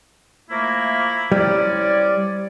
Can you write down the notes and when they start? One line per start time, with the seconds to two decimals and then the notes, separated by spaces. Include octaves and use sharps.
0.50 F3 A3 A#3 E4
1.32 G3 C4 C#4 E4 D5